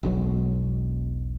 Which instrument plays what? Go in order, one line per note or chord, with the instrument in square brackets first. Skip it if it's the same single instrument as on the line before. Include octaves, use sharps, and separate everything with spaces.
[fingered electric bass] E1 B1 B2 F#3